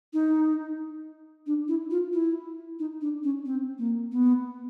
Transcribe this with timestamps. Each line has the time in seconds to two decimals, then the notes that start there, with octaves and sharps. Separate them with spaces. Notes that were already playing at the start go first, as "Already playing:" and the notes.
0.13 D#4
1.46 D4
1.68 E4
1.90 F4
2.13 E4
2.79 D#4
3.01 D4
3.23 C#4
3.45 C4
3.78 A#3
4.12 B3